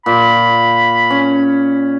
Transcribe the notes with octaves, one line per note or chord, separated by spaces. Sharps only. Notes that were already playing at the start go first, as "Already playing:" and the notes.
A#2 B5
C#4